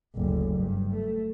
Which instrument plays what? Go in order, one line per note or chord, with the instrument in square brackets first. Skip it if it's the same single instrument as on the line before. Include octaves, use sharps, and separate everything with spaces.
[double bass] F#1 D2
G2
A3